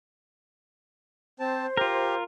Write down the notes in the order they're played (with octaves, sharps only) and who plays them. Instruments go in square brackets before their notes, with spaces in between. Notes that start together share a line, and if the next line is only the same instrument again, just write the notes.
[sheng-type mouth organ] C4 A5 [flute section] C5
[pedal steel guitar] F4 A#4 [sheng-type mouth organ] G4